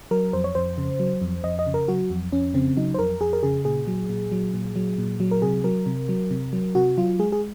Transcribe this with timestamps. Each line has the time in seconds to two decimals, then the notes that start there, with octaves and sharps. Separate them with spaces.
0.11 F#3 A#4
0.33 F2 C5
0.44 C#5
0.55 F2 C5
0.78 C#3
1.00 F#3
1.22 F2
1.44 F2 D#5
1.59 D#5
1.67 C#3
1.74 A#4
1.88 F#3 F#4
2.10 F2
2.32 F2 C#4
2.54 C#3 C4
2.77 F#3 D#4
2.94 C5
2.99 F2 A#4
3.21 F2 G#4
3.33 A#4
3.43 C#3 G#4
3.65 A#2 G#4
3.87 F#3
4.09 A#2
4.32 F#3
4.54 A#2
4.76 F#3
4.98 A#2
5.20 F#3
5.31 A#4
5.42 C3 G#4
5.64 F#3 A#4
5.86 C3
6.09 F#3
6.31 C3
6.53 F#3
6.75 C3 F#4
6.98 F#3 F4
7.19 G#3 G#4
7.32 G#4